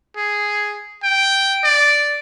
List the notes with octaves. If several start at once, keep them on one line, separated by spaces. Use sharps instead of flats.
G#4
G5
D5